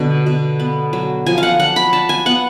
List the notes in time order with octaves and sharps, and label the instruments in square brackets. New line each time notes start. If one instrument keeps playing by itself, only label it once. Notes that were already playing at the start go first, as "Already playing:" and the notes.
Already playing: [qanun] B2 D3
B2
B3
F#3
F3 G#5
F5
F#5
D4 F#5
B5
D4 A5
G#5
B3 F#5